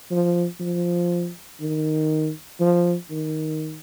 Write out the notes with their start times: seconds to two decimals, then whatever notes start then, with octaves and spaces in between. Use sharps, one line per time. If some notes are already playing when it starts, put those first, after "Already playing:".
0.11 F3
0.60 F3
1.60 D#3
2.60 F3
3.10 D#3